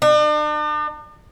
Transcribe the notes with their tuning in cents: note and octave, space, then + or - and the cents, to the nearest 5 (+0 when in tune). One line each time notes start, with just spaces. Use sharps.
D4 +45